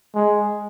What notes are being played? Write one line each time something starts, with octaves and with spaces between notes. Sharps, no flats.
G#3